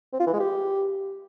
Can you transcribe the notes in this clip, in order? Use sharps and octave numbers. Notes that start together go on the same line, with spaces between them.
C4
F4
E3
G#3
G4